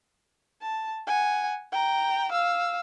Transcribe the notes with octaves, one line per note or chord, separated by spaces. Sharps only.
A5
F#5 G#5
G5 A#5
F5 E6